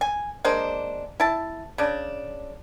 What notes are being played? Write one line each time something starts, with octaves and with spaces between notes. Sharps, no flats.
G#5
G#3 A#3 D4 C5
E4 A5
C#3 D4